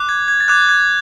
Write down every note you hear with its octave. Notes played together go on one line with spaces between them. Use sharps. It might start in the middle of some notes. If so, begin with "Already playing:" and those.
Already playing: D6 F#6
G#6
G#6
A6
D6 F#6 G#6
G#6